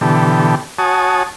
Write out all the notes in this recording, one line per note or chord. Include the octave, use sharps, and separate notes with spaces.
B2 D3 E3 G4 A4
F#4 C#5 G#5 A5 D#6